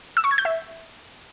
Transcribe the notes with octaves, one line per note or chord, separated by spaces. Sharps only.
E6
C#6
G#6
G6
E5